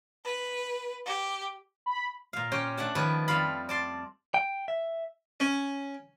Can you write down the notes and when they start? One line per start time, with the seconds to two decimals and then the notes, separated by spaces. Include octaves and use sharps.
0.25 B4
1.05 G4
1.86 B5
2.33 A#2 F5
2.52 C#4 G4 C5 C#5 G5
2.77 A3 D4 F#5 A5
2.95 D#3 F3 B4 C#5
3.28 F2 G3 F4 F5 B5
3.69 D5 A5 C6
4.34 G5
4.68 E5
5.40 C#4